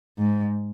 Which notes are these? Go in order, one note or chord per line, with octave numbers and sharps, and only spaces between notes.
G#2